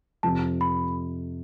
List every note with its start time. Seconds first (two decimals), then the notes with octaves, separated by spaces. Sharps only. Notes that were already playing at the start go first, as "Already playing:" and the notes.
0.23 F2 C3 F3 A5
0.61 B5